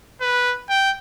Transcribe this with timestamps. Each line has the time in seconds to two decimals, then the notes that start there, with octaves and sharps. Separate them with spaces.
0.21 B4
0.70 G5